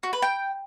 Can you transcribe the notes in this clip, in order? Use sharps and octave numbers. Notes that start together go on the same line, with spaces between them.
F#4
B4
G5